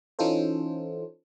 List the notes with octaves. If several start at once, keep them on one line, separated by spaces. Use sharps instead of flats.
E3 C#4 D#4 F4 A4 C5